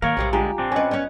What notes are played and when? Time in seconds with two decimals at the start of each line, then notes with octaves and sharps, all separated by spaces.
0.02 D#3 A#3 A#4 C#5
0.17 A#1 C3 G3 C4
0.33 D3 G#3 F4 G4 G#5 A#5
0.58 A1 C4 D4
0.72 C#4 B4 D#5 G#5
0.91 B3 C#4 D5